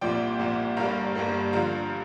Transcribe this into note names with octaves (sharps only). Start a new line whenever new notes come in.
C2 A#2 F3 D5 G5
C2 A#2 F3
G1 G2 G3 A#3 F5 A#5
G1 G2 G3 A#3
G2 D3 F3 F5 A#5